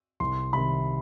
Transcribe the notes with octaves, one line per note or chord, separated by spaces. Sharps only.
C2 C6
C3 D#3 B5